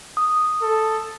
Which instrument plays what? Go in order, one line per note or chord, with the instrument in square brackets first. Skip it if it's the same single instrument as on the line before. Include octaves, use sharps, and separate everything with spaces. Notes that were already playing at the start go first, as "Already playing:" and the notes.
[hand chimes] D#6
[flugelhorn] A4